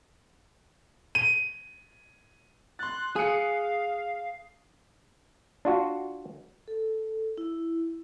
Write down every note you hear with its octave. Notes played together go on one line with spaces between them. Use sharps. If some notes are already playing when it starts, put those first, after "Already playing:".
D#7
C6 F#6 A6
G#4 F5 D#6 F#6 C#7
D4 F4 F#4
A4
E4